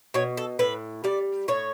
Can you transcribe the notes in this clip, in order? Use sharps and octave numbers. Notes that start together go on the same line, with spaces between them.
B2 C#5
A4
A2 B4
G3 D5
A2 C#5